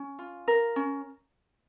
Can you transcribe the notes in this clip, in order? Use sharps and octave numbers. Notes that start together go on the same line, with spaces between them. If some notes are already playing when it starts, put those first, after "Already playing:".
Already playing: C#4
F4
A#4
C#4